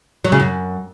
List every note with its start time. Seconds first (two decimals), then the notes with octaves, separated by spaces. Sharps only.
0.24 F#3
0.32 C#3
0.40 F#2